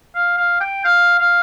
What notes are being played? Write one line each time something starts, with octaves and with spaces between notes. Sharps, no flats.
F5
F5
G5
F5
F5